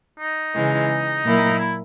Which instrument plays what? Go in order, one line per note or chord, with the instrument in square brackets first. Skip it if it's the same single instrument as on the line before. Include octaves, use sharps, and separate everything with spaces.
[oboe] D#4
[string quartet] C#3 E3 G#3
A#2 F#3 A#3 E4 A#4
[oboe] E4